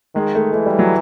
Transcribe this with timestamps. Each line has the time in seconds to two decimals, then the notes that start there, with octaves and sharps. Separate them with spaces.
0.15 D#3 G#3
0.35 A3
0.53 E3 A3
0.66 G3
0.79 F#3